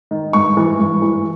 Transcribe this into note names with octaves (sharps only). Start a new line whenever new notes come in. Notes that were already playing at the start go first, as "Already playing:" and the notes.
D#3
G2 C#6
E3
G2
E3